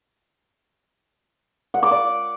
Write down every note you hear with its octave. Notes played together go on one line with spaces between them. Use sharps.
F#5
D6
D5